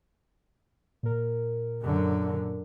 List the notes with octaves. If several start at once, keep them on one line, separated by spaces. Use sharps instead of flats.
A#2 A#4
F#2 D3